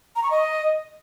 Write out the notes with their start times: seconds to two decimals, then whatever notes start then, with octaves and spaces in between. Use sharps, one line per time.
0.16 A#5
0.23 C#6
0.31 D#5